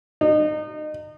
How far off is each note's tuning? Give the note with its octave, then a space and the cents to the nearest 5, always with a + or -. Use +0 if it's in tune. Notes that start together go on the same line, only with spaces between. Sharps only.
D#4 -30